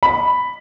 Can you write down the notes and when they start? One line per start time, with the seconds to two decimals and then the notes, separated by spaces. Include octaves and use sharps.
0.03 B5